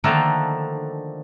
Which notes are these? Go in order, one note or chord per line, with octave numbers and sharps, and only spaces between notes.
D3 D#3 F3 A3 A#3 D4